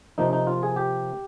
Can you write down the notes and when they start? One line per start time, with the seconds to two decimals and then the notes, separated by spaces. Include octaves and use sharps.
0.18 C3 F3 A#3 D#4
0.33 D#4
0.47 F4
0.63 G#4
0.76 G4